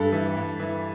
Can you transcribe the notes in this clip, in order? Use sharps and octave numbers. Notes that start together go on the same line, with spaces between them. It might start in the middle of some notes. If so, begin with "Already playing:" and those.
Already playing: G2 A4
E3
G2
E3